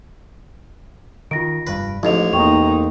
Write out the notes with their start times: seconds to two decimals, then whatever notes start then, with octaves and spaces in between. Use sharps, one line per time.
1.31 D#3 F4 A#6 D7
1.67 F1 G2 B4
2.03 A1 G#2 F3 E4 F7
2.33 E2 A#3 D#4 G5 C#6 F7